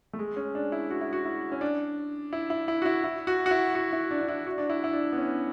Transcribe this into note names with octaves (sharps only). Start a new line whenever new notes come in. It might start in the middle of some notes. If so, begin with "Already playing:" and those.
A3
G#3
C#4
D4
E4
F#4
E4
F#4
E4
C#4
D4
E4
E4
E4
F#4
E4
E4
F#4
F#4
E4
F#4
E4
D4
D4
E4
F#4
D4
E4
E4
D4
B3
C#4